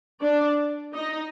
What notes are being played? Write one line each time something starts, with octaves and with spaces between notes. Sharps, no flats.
D4 D5
D#4 D#5